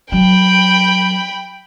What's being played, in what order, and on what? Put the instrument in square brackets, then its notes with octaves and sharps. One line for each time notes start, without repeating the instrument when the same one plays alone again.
[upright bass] F#3 [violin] G5 B5